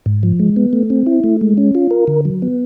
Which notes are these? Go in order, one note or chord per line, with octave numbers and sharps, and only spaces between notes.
G#2
F3
G#3
B3
A3
C4
E4
A3
G#3
C#4
F4
A#4
D3
F#3
B3